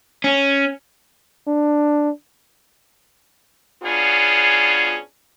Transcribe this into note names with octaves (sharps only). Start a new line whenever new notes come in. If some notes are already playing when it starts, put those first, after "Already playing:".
C#4
D4
B2 B3 C#4 D4 F4 G#4